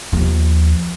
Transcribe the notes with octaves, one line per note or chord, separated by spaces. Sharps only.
D#2 F3